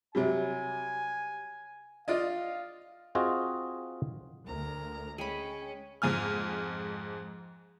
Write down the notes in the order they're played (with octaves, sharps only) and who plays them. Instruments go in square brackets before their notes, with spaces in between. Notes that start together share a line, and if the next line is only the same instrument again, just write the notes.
[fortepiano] C3 F#3 G3 [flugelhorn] G#5
[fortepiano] F4 D5 D#5 [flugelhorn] F5
[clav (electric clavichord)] C4 F4 F#4 G#4 D#5
[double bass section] D2 [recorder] A#4 [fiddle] A#5
[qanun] G#3 B5 [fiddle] C#4 [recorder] G5
[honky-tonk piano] F2 G#2 G#5 F6